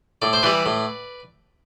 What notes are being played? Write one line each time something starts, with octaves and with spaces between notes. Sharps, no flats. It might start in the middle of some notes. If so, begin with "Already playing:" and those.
A2 D5
C5
E3 G3 B4 D5
A2